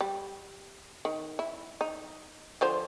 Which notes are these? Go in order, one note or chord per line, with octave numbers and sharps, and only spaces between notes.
G3
D#3
E4
D#4
D3 F3 C5